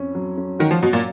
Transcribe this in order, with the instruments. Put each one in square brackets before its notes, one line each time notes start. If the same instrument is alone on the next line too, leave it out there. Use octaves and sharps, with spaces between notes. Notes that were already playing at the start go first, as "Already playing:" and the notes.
Already playing: [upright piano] F2 C#4
F#3
C#4
[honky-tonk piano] D#3 [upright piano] F#4
[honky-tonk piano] F3
[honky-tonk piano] B2 [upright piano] F#3
[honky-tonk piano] A#2